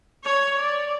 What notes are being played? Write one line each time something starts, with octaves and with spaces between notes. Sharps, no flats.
C#5
D5